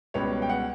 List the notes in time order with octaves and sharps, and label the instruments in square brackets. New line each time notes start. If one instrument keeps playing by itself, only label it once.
[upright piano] C#2 B2 G3 B3 C#5
G5
F#5